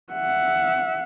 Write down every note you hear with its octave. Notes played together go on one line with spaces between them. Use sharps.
E5 F#5